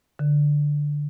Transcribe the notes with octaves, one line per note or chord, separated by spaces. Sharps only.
D3